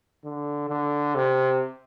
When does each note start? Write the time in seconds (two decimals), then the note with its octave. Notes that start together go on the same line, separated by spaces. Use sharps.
0.25 D3
0.69 D3
1.15 C3